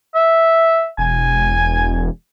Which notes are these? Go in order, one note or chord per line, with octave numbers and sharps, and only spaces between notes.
E5
E1 G#5